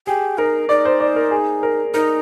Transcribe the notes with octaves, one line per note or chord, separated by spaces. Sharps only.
G4 G#4
D#4 A#4
D#4 D5
C5
D5
A#4
G#4
A#4
D#4 A#4